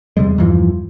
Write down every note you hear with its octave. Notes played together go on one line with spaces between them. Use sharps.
E2 C3 G3 G#3
E2 G2 E3 F3